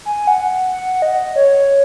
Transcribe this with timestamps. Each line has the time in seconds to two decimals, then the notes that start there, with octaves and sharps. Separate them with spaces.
0.05 G#5
0.27 F#5
0.70 F#5
1.02 D#5
1.36 C#5